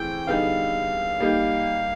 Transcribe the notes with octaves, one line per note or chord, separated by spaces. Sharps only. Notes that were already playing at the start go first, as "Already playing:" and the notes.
Already playing: E3 A3 C4 G#4 G5
D3 G3 B3 D#4 G#4 F5
G3 A#3 D#4 G4